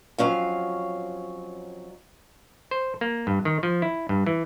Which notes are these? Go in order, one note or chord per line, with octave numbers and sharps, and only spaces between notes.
F2 F#3 C#4 F5
C5
A#3
G2
D#3
F3
E4
G2
E3